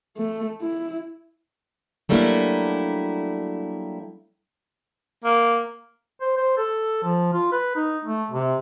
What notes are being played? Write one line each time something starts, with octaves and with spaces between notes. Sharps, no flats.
A3
E4
F#3 G3 A3 A#3 D4 E4
A#3
C5
C5
A4
F3
F4
B4
D#4
A3
C3